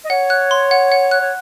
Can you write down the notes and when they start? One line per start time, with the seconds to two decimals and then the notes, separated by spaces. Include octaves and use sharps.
0.05 D#5
0.10 C#5 F#5
0.30 F#6
0.51 C6
0.71 F#5
0.92 F#5
1.11 F#6
1.21 C#5